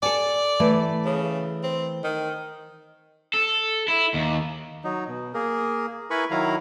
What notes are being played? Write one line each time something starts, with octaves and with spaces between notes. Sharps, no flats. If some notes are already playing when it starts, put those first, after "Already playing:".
A4 D5 G#5
E3 A3
C#3
C4
D#3
A4
E4
D#2
F#3 D#4
B2
A#3 G#4 A#4
E4 A#4 B4 G#5 B5 C#6
D#3 F#3 E4 F5 A#5